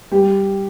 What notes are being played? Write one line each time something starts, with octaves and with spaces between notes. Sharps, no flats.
G3 G4 G5